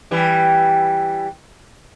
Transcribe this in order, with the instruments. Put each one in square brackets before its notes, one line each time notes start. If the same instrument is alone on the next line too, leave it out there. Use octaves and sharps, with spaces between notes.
[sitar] E3 G3